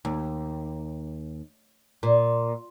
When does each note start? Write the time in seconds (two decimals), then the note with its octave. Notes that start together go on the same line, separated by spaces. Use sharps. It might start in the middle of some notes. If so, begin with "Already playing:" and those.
0.05 D#2
2.03 A#2